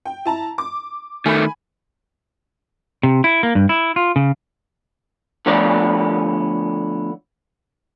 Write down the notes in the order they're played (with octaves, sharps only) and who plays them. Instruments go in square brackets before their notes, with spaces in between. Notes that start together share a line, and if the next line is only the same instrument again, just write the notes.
[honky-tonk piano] G5
E4 A5 A#5
D6
[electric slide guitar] D#3 A3 [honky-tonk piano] G#5 B5
[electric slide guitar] C3
E4
A#3
G2
E4
F4
C#3
[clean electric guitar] D3 F3 A3 B3 C#5 D5